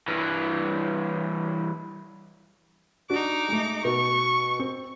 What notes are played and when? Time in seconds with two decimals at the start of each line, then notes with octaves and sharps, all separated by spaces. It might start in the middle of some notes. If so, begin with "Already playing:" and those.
0.08 G2 E3
3.10 D4 D#4 F#4 D6
3.48 G#3 A3
3.85 B2 C#6
4.59 C4